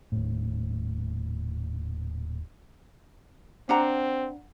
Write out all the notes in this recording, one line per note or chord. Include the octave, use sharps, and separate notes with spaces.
D#1 A2
C4 D4 F#5 A#5